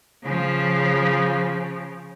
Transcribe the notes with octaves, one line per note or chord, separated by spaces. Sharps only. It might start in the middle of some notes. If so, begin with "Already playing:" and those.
C#3 F3